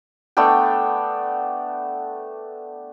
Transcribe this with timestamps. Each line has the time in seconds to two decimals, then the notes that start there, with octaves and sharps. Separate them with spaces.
0.37 A3 B3 D4 G5